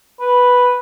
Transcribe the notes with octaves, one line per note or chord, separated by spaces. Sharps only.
B4